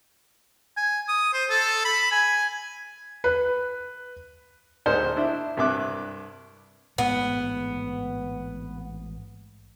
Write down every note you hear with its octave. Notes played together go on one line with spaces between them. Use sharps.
G#5
D#6
C5
A4
B5
G#5
B4
D2 G#2 C5 F6
D4 E4
C2 G2 E5 D6 F#6
A1 G#2 G#3 B3